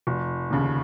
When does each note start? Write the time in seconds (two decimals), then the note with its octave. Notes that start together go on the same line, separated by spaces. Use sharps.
0.07 F1
0.50 D#2 C#3